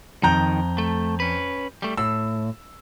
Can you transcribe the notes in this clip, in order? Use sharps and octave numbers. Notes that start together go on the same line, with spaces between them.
F2 D#3 A#5 G6
A3
C#4 B4
G3 A3
A2 E6